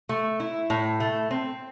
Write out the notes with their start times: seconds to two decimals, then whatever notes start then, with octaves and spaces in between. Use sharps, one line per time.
0.09 A3
0.40 E4
0.70 A2
1.00 A3
1.31 C4